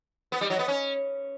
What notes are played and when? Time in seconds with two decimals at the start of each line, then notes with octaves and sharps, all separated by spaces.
0.32 B3
0.41 G3
0.50 F#3
0.59 B3
0.68 C#4